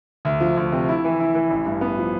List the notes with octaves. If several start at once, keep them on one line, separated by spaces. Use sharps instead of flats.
D2
F3
D2
C3
E4
E3
E4
E3
A1
G2
B3
F3